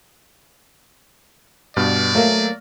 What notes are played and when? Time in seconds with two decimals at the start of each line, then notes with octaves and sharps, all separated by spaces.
1.77 G2 B2 D5 F6
2.15 F#3 A3 A#3 E5 F5